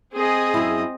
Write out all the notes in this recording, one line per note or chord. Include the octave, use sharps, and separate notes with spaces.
C4 G#4 D#5
F#2 E4